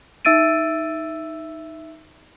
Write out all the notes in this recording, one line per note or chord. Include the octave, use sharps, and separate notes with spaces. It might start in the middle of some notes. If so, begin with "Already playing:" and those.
D#4 E5 E6 A6 D7 D#7